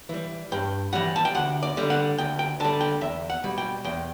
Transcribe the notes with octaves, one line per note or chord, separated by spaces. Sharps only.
E3 G3
G2 G5
E3 G3 F#5
A5
G5
D2 F#5
D5
D3 G3
F#5
D2 G5
G5
D3 G3 A5
G5
E2 E5
F#5
B2 G3
G5
E2 G5